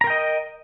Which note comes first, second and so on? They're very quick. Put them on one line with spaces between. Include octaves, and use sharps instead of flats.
A#5 A#4 G5 D#5